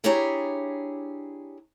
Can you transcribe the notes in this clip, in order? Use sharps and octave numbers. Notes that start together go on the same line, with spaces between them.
D4 E4 G4 G#4 C#5 A#5